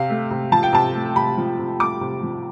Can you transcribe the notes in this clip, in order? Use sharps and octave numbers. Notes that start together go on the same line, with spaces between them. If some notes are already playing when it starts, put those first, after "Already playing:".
Already playing: C3 F5
A3
C3
F3 A5
G5
C3 A5
A3
C3 B5
F3
C3
A3 D6
C3
F3